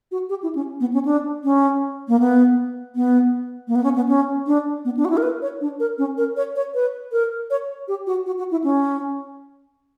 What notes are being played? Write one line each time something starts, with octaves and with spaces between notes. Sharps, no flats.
F#4
G4
E4
C#4
B3
C#4
D4
C#4
A#3
B3
B3
A#3
B3
C#4
B3
C#4
D4
B3
D4
F#4
E4
A#4
B4
C#5
D4
A#4
C#4
A#4
C#5
C#5
B4
A#4
C#5
G4
F#4
F#4
F#4
E4
C#4